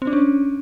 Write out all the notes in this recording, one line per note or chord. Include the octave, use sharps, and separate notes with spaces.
C4
D4
C#4